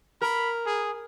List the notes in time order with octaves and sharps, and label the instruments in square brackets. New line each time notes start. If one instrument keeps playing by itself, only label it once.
[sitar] A#4 [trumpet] B5
[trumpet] G#4